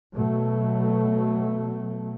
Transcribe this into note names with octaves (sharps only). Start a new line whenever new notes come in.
B2 F#3 A3